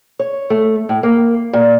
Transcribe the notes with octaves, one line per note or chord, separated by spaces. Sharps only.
C#5
A3
A2
A#3
A#2